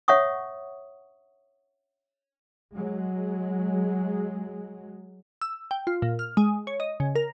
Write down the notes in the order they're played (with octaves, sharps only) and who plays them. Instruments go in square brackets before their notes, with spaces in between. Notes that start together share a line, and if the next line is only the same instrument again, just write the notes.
[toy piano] C#5 E5 F#5 C#6 D#6
[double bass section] F#3 G#3
[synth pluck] E6
G5
F4
A#2
F6
G#3
C#5
D#5
C#3
A#4